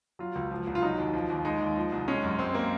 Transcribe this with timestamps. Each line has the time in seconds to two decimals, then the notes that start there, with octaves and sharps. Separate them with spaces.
0.19 F#3 F4
0.35 C#2
0.51 F3
0.67 C2
0.75 F4
0.82 F#3 D#4
0.98 D#2
1.13 F3
1.30 D#2
1.45 G#3 D#4
1.61 D#2
1.77 F3
1.92 C2
2.08 G#3 C#4
2.23 F#2
2.39 G#3 C4
2.54 A#3